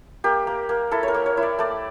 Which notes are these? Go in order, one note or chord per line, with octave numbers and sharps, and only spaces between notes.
A#3 G4
A#3
A#3
E4 A4
C#5
A#4
A#3
C#5
E4
D5
A3 D5